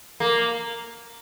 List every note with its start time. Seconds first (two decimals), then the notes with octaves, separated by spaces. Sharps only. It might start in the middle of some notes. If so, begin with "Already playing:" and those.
0.20 A#3